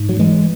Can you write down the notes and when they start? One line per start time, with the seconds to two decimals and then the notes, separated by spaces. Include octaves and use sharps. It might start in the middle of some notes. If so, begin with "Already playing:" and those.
Already playing: G#2
0.09 F#3
0.19 E3 G#3